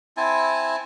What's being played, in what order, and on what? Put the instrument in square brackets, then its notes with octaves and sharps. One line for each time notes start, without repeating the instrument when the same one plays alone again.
[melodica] C4 E4 G#5 A5